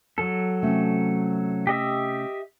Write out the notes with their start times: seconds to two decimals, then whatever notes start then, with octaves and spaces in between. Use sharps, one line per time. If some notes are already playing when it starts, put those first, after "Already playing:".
0.18 F#3 A4 A5
0.62 C3 A3 C#4
1.67 G4 D#5 E5